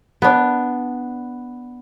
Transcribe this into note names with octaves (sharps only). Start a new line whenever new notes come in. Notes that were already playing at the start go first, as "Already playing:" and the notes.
B3 D4